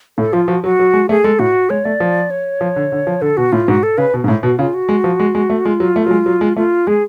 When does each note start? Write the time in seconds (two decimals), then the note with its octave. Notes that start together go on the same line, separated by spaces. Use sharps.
0.18 A2 A4
0.33 F3 F4
0.48 F3 F#4
0.64 F#3 F#4
0.79 F#3
0.93 G#3
1.09 A3 G#4
1.24 G#3 A4
1.39 A2 F#4
1.70 G#3 C#5
1.85 A3 D5
2.00 F3
2.31 C#5
2.61 F3
2.76 D3
2.92 D3
3.07 F3
3.22 D3 A4
3.37 B2 F#4
3.52 A2 F4
3.68 G#2 F#4
3.83 A4
3.98 C#3 B4
4.14 B2
4.24 G#2
4.28 A2
4.43 B2 F#4
4.59 C#3 F4
4.74 F#4
4.89 G#3
5.04 F3
5.20 G#3
5.35 G#3
5.50 A3
5.65 G#3 F4
5.80 F#3
5.96 A3
6.06 F#3
6.11 G#3
6.26 F#3
6.41 G#3
6.57 A3 F4
6.87 G#3 G#4